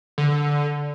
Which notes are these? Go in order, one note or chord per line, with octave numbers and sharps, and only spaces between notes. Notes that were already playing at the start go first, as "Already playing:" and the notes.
D3